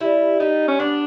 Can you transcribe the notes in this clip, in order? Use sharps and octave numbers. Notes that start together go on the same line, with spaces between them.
G3 E4
G3 D#4
C#4
B3 D4